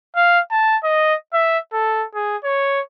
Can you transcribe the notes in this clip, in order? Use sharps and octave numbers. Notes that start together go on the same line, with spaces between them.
F5
A5
D#5
E5
A4
G#4
C#5